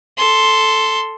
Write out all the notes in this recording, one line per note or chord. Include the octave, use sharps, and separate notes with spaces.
A4 C6